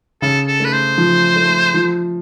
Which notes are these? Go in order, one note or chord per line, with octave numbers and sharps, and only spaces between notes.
C#3 A4
A4
A3 B4
C5
F3
A3
F3